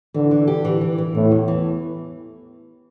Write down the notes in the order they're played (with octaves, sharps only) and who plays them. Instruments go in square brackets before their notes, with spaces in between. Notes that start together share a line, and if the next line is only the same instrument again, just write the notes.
[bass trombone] D3 [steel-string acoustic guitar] E3
[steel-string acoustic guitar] E3
G4
E3
E3
E3
[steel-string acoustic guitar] E2 [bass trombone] A2
[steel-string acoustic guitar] E2
E3